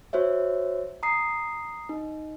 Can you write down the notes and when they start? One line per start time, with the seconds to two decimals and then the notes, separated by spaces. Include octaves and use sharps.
0.13 F#4 C5 C#5 E5
1.03 A#5 D#6 C7
1.89 D#4